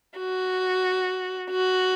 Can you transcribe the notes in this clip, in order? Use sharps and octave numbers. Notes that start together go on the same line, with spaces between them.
F#4
F#4